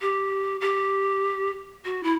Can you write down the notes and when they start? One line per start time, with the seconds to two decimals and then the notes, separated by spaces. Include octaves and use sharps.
0.01 G4
0.61 G4
1.85 F#4
2.03 E4